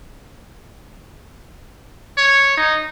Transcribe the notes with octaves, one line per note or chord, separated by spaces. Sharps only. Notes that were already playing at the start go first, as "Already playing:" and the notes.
C#5
D#4